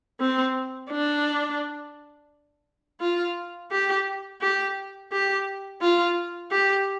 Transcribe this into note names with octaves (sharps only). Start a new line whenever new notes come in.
C4
D4
F4
G4
G4
G4
F4
G4